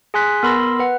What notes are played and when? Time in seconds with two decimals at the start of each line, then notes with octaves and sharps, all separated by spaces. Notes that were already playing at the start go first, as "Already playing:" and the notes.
0.14 G#4 G#5 C6 F#6 B6
0.43 B3 A#4 B5 C6 E6 A#6
0.79 B4 F#5